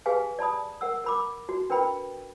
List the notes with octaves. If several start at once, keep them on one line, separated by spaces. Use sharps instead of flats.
G4 G#4 B4 F5 G#5
D5 A5 B5 D#6
A#4 F#5 E6
A#4 B5 D6
F#4
D4 A#4 B4 G5 B5